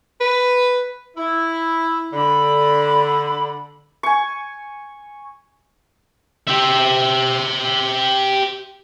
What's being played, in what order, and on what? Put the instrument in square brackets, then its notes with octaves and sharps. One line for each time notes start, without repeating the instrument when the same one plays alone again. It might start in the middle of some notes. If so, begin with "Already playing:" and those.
[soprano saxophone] B4
[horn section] E4
[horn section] D3 [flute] B5
[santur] G#5 C#6
[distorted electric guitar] G4 E5